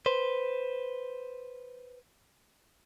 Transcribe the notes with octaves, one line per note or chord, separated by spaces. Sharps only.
B4 C5